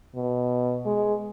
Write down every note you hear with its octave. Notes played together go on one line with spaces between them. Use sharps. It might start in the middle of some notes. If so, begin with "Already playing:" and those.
B2
G#3